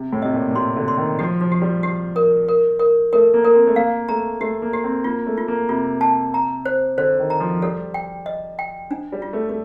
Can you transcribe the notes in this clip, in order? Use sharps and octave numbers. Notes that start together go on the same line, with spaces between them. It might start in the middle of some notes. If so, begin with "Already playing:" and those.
Already playing: C3
A2
C3 D#5
A#2
A#2
C3 C6
D3
C6
D#3
F3 G4
F3
G4
G3
G4
A#4
A#4
A#4
A3 A#4
A#3
A#4
C4
A3
A#3 F5
A3 A#5
A3 G4
A#3
G4
C4
A#3 F4
A3
F4
A#3
C3 F4
A5
A#5
C5
D3 C5
D#3
A#5
F3
G3 A4
G5
D#5
G5
D4
G3
F4
A3
A3